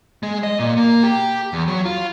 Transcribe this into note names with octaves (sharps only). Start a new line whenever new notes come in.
G#3
D#5
A#2
A#3
G4
E2
F#3
F4